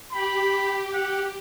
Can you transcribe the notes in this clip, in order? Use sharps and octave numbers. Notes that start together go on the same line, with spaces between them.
G4 B5
F#5